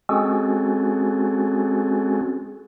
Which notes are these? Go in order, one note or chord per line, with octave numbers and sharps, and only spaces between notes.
G#3 C4 C#4 F#4 G#4 A4